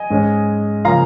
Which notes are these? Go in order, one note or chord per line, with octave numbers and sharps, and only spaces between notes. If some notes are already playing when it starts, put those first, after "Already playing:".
Already playing: D#5 G#5
G#2 G#3 C#4
C#3 F3 A#3 C#4 F5 A#5